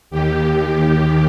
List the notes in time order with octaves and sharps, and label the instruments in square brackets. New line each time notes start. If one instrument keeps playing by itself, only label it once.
[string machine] D#2 D#3 G4